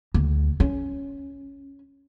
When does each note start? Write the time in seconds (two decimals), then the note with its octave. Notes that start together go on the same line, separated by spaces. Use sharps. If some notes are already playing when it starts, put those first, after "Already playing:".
0.14 D2
0.60 C#4